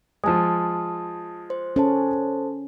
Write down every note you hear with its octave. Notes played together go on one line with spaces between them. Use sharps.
F3 G#3 A5 D#6
C5
C#4 A4 C5 A5